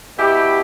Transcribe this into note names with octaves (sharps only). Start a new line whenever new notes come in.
B2 E4 G4